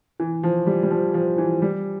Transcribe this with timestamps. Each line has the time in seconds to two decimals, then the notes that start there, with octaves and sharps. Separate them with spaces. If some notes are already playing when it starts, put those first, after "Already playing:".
0.20 E3
0.43 F3
0.67 G3
0.83 G3
0.91 F3
1.14 F3
1.38 E3
1.62 G3